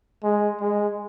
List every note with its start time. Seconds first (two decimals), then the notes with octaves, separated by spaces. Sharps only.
0.23 G#3
0.60 G#3